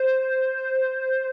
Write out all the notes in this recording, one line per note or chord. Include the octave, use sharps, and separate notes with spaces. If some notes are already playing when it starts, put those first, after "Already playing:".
Already playing: C5